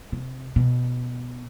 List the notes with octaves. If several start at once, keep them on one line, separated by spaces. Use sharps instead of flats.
C3
B2